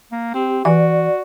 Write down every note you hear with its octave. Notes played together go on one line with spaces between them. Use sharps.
A#3
C4 G4
E3 F#4 D5